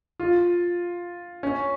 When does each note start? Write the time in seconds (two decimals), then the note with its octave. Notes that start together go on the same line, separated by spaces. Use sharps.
0.20 F4
1.43 C#4